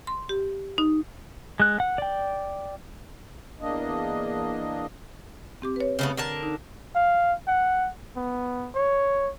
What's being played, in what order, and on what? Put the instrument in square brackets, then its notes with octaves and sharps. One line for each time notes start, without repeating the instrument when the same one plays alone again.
[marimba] C6
G4
D#4
[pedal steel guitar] G#3 F#6
F#5
D5 G5
[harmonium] E2 A#3 D4 D#5
[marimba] C4 G4 D6
B4 C#5
[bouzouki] C#3 A3 B3
D3 A#4 A5
[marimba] D#4
[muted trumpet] F5
F#5
B3
C#5